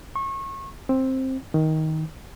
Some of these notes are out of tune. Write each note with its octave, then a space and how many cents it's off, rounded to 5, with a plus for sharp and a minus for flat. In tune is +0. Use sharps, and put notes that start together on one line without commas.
C#6 -30
C4 +10
D#3 +15